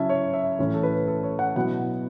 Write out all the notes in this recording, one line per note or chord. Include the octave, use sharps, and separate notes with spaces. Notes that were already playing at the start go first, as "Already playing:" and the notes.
Already playing: C#3 F#3 C#4 E4 E5 A5
C#5
E5
A2 E3 C#4 E4
A4
B4
A4
C#5
F#5
B2 F#3 B3 E4 F#5